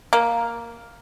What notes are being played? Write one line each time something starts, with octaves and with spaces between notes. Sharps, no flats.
A#3